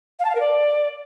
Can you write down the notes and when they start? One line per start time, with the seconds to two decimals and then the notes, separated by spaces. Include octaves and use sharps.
0.19 F5
0.24 A5
0.29 F5
0.35 A#4
0.40 D5